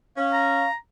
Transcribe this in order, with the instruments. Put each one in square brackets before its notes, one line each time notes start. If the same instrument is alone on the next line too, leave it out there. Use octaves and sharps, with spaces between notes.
[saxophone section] C#4 [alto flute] F5
[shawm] A#5